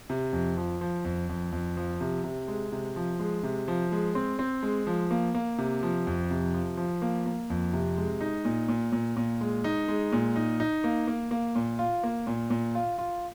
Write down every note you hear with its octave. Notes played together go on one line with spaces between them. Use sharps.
C3
F2
F3
F3
F2
F2
F2
F3
C3
C3
G#3
C3
F3
G#3
C3
F3
G#3
C4
C4
G#3
F3
A#3
A#3
C3
F3
F2
C3
F3
F3
A#3
A#3
F2
C3
G#3
D#4
A#2
A#2
A#2
A#2
G#3
D#4
G#3
A#2
D#4
D#4
A#3
A#3
A#3
A#2
F4
A#3
A#2
A#2
F4
F4